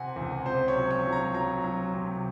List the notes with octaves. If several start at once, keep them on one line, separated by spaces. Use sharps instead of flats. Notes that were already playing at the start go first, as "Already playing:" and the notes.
Already playing: C3 C4 F#5 G#5
C#2
C3 C5
C#5
F#3
C#5
F#3
A#5
F#3 A#5
F#3
C3